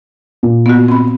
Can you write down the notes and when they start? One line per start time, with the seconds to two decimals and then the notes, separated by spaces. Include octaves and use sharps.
0.43 A#2
0.66 B3 F#4
0.88 C4 B5